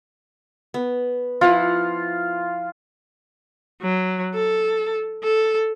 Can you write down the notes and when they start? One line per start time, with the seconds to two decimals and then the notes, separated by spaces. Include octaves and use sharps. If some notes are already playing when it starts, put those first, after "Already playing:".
0.74 B3
1.41 F3 E4 F4 F#5
3.82 F#3
4.35 A4
5.23 A4